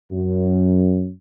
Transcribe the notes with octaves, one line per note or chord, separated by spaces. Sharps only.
F#2